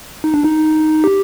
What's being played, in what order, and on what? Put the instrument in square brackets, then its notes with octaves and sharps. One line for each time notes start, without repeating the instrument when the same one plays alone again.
[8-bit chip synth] D#4
D4
D#4
G4